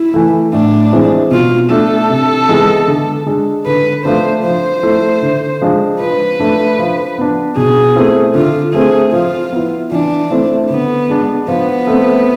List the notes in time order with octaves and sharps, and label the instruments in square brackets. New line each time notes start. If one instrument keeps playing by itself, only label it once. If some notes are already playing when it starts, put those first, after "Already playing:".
Already playing: [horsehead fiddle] E4
[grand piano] E3 A3
[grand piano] A2 [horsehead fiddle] D4
[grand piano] E3 G#3 C4 E4
[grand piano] B2 [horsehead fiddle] F4
[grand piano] A3 D4 [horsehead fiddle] A4
[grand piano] C3
E3 G#3 B3 E4
D3
G#3 D4
[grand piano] D3 [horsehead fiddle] B4
[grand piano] F3 A3 D4 [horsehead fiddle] C5
[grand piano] F3 [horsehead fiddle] C5
[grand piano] A3 E4
D3
F3 G#3 D4
[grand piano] F3 [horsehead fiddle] B4
[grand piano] A3 D4
F3
B3 D4
[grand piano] B2 [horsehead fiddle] G#4
[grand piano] A3 C4 E4
[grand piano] D3 [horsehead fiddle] F4
[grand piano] A3 C4 [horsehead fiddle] G#4
[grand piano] F3 [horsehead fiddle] F4
[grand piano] B3 E4
[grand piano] E3 [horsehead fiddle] D4
[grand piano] A3 C4 E4
[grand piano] D3 [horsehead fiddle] B3
[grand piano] G#3 D4
[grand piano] F3 [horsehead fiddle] B3
[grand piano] A3 C4